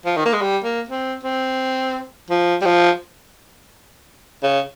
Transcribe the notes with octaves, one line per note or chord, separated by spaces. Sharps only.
F3
D#3
A#3
G#3
G3
A#3
C4
C4
F3
G3
F3
C#3